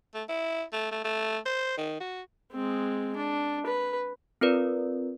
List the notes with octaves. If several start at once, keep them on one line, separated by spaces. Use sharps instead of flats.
A3
E4
A3
A3
A3
C5
D#3
F#4
G#3 C4
D4
B4
C4 F4 A#4 B4 D5